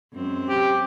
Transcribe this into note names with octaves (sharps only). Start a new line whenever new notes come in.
F#2 G#3 C4
G4